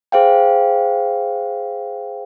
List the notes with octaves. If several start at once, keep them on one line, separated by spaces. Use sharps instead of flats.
G#4 C5 F5 G5